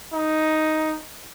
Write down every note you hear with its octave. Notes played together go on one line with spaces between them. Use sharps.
D#4